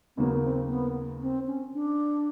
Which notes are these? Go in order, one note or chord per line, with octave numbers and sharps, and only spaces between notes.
D#2 C#3 F#3 A#3 B3
C4
B3
C4
C#4
D4